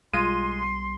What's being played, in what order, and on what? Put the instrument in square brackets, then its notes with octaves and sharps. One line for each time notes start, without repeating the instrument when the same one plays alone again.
[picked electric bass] B1 B2 G3 [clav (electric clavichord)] G#3 [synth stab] F4 D#7 [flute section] C6